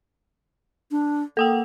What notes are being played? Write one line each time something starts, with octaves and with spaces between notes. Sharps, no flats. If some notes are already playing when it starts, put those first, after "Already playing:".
D4
A#3 A4 F#5 G5